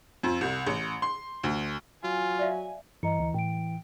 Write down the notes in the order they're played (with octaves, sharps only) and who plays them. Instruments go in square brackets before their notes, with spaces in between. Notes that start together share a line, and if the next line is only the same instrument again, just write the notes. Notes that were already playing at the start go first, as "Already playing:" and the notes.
[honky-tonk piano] F2
C2
A1
C6
D2
[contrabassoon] F#3 [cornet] F4 [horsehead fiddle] G#5
[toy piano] D5 E5 F5
[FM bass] G2 [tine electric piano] E3 [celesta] D#5 A#5 C#7
[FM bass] D2
[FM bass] A2 [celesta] G5 D7